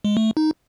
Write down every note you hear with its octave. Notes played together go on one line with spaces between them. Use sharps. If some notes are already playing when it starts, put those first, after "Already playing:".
G#3
A3
D#4